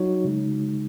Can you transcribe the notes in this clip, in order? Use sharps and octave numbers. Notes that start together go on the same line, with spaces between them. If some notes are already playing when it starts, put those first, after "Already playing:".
Already playing: F#3 D#4 F#4 C#5
C#3 G#3 D#4